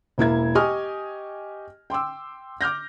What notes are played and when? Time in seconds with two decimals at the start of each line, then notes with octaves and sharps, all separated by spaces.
0.18 E1 A#3 E4 G#6
0.55 G4 D#5 G#5 C#6 D#6 F6
1.90 G5 C6 D6 E6
2.61 D6 F6 G6 A#6